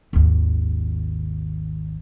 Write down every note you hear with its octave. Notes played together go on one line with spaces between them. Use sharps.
G#1 D#2